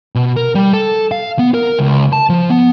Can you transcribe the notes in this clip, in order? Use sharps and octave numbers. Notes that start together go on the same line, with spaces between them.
B2
A#4
G3
A4
F5
B3
A#4
C#2
A5
F3
B3